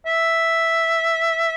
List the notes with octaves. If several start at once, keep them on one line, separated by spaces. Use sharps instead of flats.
E5